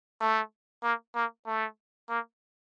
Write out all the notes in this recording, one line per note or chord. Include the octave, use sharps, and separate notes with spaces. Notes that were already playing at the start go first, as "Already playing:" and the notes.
A3
A#3
A#3
A3
A#3